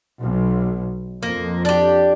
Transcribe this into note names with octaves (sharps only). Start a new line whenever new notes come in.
B1
F2 A#3
D4 G4